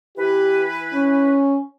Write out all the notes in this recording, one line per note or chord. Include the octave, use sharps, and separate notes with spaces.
E3 E4 G4 B4
C#4